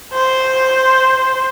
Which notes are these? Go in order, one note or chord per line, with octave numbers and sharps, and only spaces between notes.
C5